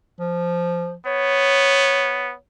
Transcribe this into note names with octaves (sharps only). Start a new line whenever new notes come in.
F3
B3 C#5